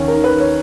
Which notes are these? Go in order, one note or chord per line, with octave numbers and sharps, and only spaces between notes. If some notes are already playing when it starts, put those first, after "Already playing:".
Already playing: D#2 C#4
A#4
D#3
B4
D#3 C#5